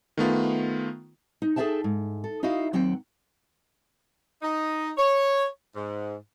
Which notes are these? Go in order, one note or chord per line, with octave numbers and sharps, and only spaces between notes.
D#3 A3 B3 F4
D#4
G#4 A4 D5 E5 G5 A5
G#2
A4
D#4 E4 F#4 D#5 F5
D#2 F#3 C4 F#5 G5
D#4
C#5
G#2